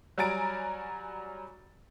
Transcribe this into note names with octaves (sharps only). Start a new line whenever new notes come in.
F#3 G3 G#5 A#5 A6 D7